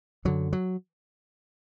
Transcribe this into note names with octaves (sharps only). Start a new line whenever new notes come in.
F#2 D3 F#3
F#3